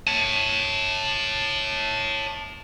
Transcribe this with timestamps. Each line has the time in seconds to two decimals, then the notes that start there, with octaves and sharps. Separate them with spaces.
0.07 C#5 A5